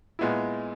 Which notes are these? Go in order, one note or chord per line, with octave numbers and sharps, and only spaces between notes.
A#2 G#3 B3 E4